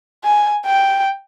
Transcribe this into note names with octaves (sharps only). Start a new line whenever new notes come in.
G#5
G5